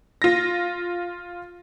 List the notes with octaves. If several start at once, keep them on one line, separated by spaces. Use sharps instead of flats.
F4 A#6